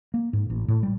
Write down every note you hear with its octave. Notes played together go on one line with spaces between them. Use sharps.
A#3
G#2
A1
A2
G3